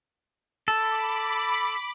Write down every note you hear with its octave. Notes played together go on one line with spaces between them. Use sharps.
A4 B5 D6